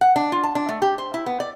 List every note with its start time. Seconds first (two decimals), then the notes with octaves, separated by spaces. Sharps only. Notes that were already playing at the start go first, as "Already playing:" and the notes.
0.01 F#5
0.16 D4
0.32 F4
0.44 A5
0.55 D4
0.69 A3
0.82 G4
0.98 C5
1.14 E4
1.26 B3
1.40 D5